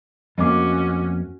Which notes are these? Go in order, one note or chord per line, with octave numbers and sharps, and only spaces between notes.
F2 A3 A#3 C#4 F#4 D#5 D6